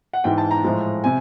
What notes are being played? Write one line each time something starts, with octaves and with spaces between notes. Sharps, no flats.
F#5
G#2 E3 G#3 G5
A5
A#5
A2 F3 G#3
C3 G#5